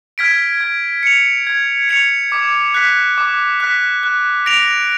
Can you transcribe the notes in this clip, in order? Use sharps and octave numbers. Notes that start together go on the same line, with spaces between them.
F6 G#6 B6 D7
G#6
C#7 F7
G#6
C#7 F7
D6
F#6 B6
D6
F#6 B6
F#6
A#6 D7 F7